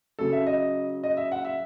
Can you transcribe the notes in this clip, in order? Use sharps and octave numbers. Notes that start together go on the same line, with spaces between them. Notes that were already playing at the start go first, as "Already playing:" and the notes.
C#3 F#3 A4
E5
D#5
D#5
E5
F#5
E5